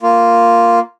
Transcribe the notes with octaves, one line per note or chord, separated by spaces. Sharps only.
A#3 F4